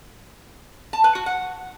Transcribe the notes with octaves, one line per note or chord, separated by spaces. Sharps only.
A5
B4
F#4
F#5